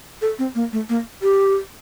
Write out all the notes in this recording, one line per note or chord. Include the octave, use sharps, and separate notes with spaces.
A4
C4
A#3
A3
A#3
G4